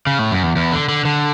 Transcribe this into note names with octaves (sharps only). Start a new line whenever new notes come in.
C#3
A2
F#2
E2
E2
D3
D3
D3